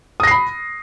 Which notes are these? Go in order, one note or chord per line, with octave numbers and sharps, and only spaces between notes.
B5 D#6 A#6 C7